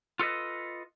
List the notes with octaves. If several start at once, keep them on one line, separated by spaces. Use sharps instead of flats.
F4 A4 B4 D#5